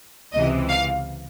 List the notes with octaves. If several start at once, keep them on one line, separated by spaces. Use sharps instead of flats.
C#2 C3 E3 D#5
F5